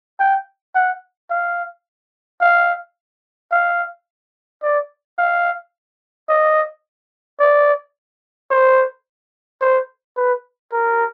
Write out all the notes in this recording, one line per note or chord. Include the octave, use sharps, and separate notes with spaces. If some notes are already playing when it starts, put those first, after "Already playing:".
G5
F#5
F5
F5
F5
D5
F5
D#5
D5
C5
C5
B4
A#4